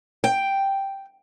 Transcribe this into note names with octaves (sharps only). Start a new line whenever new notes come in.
G5